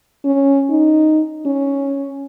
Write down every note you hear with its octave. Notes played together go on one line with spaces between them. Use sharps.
C#4
D#4
C#4